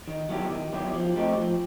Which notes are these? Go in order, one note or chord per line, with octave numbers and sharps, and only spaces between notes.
D#3
F#3 B3 E4 G4
D#3
F#3 B3 E4 G4
F3
A3 C4 D#4 G4
F3